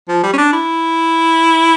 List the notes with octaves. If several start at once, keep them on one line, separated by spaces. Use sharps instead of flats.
F3
G3
C#4
D4
E4